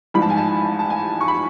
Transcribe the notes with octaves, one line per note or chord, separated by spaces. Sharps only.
A1 G#2 F3 B5
A5
G#5
A5
A5
G#5
C#6
B5